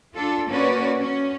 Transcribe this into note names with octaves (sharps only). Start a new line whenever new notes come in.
D4 F4 A4
A#3 C#4 F#4 B4 C#5 D5
C#4